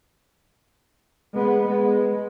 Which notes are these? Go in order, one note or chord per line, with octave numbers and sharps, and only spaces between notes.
G#3 B3
G#3